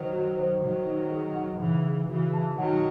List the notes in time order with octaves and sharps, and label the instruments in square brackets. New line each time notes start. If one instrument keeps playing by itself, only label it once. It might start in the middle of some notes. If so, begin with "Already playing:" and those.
Already playing: [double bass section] D#3 F#3 [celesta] C5
[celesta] F#4
C5
[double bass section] D#3 F#3 [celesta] D#4
[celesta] D#4
G#4
F#5
[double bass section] C#3 E3 [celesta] F#5
[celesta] G#4
[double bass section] C#3 E3 [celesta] F#4
[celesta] A5
[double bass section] D#3 F#3 [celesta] F#5